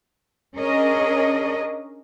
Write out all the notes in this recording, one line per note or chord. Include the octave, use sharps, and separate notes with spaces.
C#4 D4 G#4 A#4 C#5 D#5